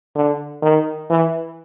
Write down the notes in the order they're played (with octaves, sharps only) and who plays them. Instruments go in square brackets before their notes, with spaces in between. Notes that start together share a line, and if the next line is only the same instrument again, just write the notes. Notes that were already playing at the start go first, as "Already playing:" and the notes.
[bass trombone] D3
D#3
E3